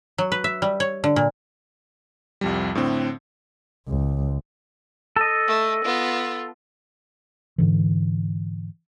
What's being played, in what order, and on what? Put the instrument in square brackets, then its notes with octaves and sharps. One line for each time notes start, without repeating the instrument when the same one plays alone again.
[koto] F#3
B4
E5
G3
C#5
D3
A#2
[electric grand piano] C2 F2 G3
A2 D3 C4
[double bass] C#2
[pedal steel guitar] A4 D#5
[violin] A3
B3 F4
[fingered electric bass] G#2 D3 E3